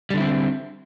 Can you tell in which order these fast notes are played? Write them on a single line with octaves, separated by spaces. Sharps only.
G3 D3 E4 C4